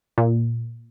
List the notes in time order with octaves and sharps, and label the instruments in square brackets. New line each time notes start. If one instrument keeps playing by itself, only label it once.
[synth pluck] A#2